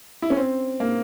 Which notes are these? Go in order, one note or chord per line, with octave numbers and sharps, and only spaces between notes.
E4
C#4
C4
A#3